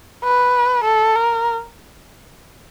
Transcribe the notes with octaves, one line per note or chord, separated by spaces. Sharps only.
B4
A4
A#4